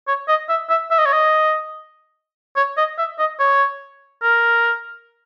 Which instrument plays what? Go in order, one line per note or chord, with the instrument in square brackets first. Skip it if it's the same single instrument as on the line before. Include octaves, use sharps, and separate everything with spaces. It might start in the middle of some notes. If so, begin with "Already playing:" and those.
[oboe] C#5
D#5
E5
E5
E5
D#5
C#5
D#5
C#5
D#5
E5
D#5
C#5
A#4